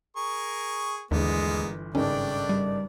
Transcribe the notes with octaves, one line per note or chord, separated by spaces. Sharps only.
G#4 A#4 C#6
G1 D#2 E3 G#3 A#3 B3
G#1 G2 C#3 A3 C#4 D4 D5 G5
G3